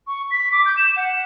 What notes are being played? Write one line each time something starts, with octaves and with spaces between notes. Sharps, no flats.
C#6
B6
D6
G6
E7
F#5